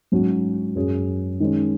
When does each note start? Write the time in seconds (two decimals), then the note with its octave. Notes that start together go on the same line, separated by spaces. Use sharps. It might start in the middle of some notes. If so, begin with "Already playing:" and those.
0.12 G#2 F#3 C#4 F#4
0.75 F#2 F#3 C#4 G#4
1.40 D#3 G#3 C#4